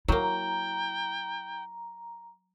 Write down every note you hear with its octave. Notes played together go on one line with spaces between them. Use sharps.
F#3 A#3 E4 G5 A#5